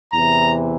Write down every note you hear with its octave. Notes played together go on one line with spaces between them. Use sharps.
E2 C3 E3 A#5